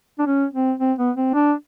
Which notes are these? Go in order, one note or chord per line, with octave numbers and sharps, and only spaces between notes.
D4
C#4
C4
C4
B3
C4
D4